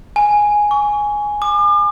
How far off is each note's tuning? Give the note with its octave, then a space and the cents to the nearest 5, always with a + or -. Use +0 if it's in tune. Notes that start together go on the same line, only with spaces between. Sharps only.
G#5 +0
C#6 +35
D6 +40